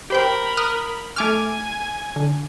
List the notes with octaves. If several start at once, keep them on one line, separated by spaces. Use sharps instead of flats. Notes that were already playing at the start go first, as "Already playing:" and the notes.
G4 A#4 C5 G5 B5
D#6 F6 F#6
A3 G#5 D6 F6
D3